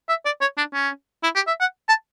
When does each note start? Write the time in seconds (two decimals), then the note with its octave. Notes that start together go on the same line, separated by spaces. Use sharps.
0.09 E5
0.25 D5
0.41 C#5
0.57 D4
0.74 C#4
1.23 E4
1.35 G4
1.47 E5
1.60 F#5
1.88 A5